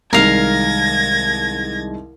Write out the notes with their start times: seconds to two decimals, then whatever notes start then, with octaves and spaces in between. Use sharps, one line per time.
0.13 C2 D#3 G#3 A#4 F5 G#6 A#6